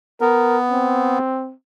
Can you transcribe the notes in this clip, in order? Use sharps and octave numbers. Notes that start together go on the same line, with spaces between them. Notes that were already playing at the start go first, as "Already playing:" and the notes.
B3 A#4
C4